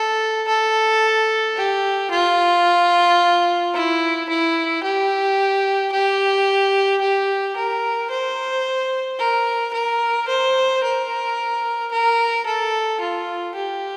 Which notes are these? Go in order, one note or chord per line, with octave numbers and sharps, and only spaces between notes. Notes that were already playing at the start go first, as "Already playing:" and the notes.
Already playing: A4
A4
G4
F4
E4
E4
G4
G4
G4
A#4
C5
A#4
A#4
C5
A#4
A#4
A4
F4
G4